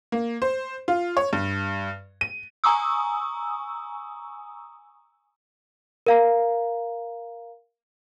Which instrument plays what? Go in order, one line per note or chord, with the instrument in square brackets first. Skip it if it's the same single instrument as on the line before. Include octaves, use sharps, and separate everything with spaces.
[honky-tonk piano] A#3
C5
F4
C#5
G2
D#7
[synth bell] G#5 A#5 C#6 D#6 E6
[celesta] A#4 F5 A#5